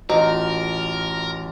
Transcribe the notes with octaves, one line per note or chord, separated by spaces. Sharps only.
A1 D#4 F4 F#4 A#4